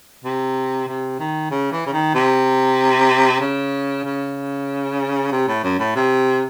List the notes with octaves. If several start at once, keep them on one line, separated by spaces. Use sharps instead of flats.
C3
C3
D#3
C#3
E3
C#3
D#3
C3
C#3
C#3
C3
A2
F#2
A2
C3